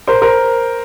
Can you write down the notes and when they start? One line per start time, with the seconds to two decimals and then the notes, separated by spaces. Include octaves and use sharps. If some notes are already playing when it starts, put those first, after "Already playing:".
0.07 A#4 C5
0.22 A#4 C5